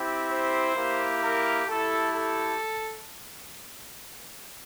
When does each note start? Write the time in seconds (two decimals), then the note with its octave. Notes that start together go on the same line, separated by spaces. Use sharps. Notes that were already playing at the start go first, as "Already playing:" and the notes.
Already playing: C4 E4 G4
0.29 C5
0.75 A#3 E4 G4
1.22 A#4
1.67 A3 E4 G4 A4
2.13 A4